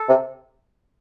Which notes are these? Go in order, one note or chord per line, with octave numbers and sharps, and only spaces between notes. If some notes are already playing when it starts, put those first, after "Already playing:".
Already playing: A4
C3